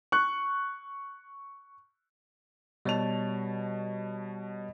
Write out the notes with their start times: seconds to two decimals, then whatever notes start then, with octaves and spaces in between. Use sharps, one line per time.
0.12 C#6 F#6
2.85 B2 G3 C#5 A5 F7